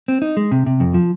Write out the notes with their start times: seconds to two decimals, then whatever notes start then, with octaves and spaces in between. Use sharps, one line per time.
0.08 C4
0.22 D#4
0.37 G#3
0.51 C3
0.66 C3
0.80 F2
0.94 F3